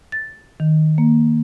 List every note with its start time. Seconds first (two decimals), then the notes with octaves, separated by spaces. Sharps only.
0.12 A6
0.60 D#3
0.98 A#3